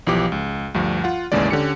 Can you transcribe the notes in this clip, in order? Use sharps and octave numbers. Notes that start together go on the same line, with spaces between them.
B1 E3 F3 G4 D6
C#2
D2 G2 F3
F4 F#5
A1 D#2 C#3 E3 G#3 D5
D3 C#4 G4 C#7